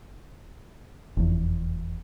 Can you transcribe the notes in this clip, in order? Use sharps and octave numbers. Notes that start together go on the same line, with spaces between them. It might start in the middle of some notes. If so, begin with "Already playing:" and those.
F1 E2